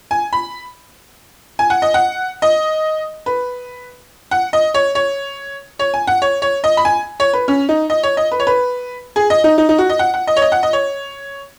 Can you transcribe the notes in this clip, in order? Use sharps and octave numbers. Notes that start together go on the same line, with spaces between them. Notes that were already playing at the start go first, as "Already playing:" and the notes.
G#5
B5
G#5
F#5
D#5
F#5
D#5
B4
F#5
D#5
C#5
C#5
C#5
G#5
F#5
C#5
C#5
D#5
B5
G#5
C#5
B4
C#4
D#4
D#5
C#5
D#5
B4
C#5
B4
G#4
D#5
D#4
D#4
D#4
F#4
D#5
F#5
F#5
D#5
C#5
D#5
F#5
D#5
C#5